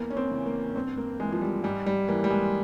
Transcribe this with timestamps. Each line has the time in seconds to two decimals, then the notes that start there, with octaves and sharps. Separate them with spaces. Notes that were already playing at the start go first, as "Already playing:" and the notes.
Already playing: E2 A#3
0.10 C#4
0.17 C4
0.31 C#3 E3
0.46 A#3
0.70 C#4
0.76 G2 C4
0.97 A#3
1.19 E3 G#3
1.32 F3
1.41 G3
1.63 G#2 G3
1.86 G3
2.08 E3 A#3
2.24 G3
2.30 G#3